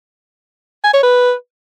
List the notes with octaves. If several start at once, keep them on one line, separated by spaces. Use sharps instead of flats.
G#5
C#5
B4